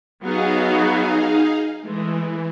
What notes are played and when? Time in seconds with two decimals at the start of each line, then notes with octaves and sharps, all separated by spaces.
0.22 F#3 B3 D#4 F#4 G#4 F5
1.83 E3 G#3 A3